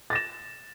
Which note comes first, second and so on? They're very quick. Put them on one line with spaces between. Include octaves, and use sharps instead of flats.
A6 A#6 E7